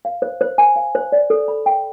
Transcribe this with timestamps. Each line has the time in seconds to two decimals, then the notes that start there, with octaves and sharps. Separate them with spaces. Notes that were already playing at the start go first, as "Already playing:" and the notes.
0.05 F5
0.22 C5
0.41 C5
0.58 G#5
0.76 F5
0.95 C5
1.12 D5
1.30 A4
1.48 B5
1.66 G5